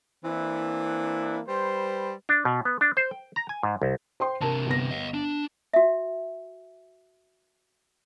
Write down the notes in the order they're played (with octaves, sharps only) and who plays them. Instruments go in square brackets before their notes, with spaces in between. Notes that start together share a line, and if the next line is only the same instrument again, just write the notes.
[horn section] E3 A#3 C4 D4 E4
G3 B4 C5
[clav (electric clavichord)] D4
B2
B3
D4
C5
G5
A#5
G#5
G#2
C2
[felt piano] C5 G5 C6
[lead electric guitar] C3 D4 [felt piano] A#4 A5
[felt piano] G1 B3 A#6
[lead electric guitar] D#5 F5
D4
[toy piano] F#4 E5